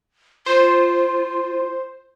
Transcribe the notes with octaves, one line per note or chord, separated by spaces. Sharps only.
F4 C5